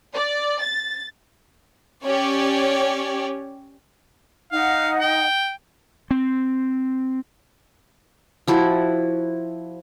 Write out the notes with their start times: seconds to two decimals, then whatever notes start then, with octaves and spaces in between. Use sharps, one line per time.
0.14 D5
0.62 A6
2.03 C#4 G4 C#5 D5
4.52 D#4 F5 F#5
5.01 G5
6.11 C4
8.47 F3 E4 F#4